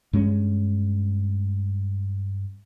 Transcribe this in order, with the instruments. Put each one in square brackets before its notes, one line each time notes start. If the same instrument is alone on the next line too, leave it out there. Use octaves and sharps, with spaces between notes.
[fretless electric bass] G2 G#3 C4 C#4